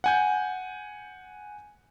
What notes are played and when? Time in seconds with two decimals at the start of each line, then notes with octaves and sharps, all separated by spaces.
0.04 F#5 G#5 G6